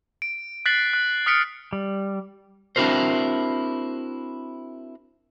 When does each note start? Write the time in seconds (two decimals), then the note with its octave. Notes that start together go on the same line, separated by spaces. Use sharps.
0.22 D7
0.66 F#6 A6 B6 C7 F#7
0.93 F#6
1.26 D#6 F6 B6 C#7 D7
1.73 G3
2.76 C4 D4 E4 F#4 A#4 C5